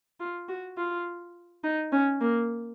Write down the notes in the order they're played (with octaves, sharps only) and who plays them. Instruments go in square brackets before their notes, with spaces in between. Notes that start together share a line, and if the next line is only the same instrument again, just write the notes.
[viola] F4
F#4
F4
D#4
C#4
A#3